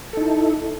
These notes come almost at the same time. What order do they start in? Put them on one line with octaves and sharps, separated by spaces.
A4 D#4 E4